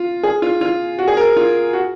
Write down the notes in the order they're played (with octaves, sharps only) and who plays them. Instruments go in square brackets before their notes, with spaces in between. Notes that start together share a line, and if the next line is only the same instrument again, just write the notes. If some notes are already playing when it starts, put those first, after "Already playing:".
Already playing: [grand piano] F4
G#4
F4
F4
F#4
G#4
A#4
F4
F#4